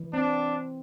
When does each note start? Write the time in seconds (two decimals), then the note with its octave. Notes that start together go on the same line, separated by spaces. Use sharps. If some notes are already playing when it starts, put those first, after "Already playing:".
Already playing: E3
0.13 C4 D4